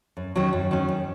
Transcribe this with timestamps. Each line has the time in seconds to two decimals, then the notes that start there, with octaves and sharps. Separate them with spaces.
0.17 F#2
0.36 D#3 F#3 C#4
0.53 F#2
0.71 D#3 F#3 C#4
0.88 F#2